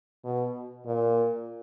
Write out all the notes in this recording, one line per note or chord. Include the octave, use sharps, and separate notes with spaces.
B2
A#2